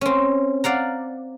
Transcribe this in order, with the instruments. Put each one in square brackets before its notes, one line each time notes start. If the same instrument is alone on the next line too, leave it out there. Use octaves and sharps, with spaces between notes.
[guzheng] C4 C#4
D5 F5 F#5 A#5